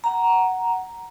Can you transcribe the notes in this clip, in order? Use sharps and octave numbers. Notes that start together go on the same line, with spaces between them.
F#5 A#5